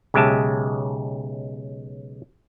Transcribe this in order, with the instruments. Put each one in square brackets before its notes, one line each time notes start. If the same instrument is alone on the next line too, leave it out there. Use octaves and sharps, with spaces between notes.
[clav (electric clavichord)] B1 C#3 G#3 G4 E5 A5